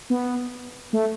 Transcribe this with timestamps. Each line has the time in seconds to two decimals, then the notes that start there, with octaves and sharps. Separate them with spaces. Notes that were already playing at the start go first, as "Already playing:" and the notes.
0.10 B3
0.93 A3